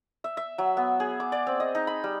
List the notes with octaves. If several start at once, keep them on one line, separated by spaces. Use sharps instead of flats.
E5
E5
F#3
B3
G#4
D6
D5
C4
D#5
D#4
B5
G3